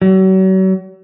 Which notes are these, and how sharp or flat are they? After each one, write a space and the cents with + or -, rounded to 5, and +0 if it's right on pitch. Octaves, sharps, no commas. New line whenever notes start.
F#3 +40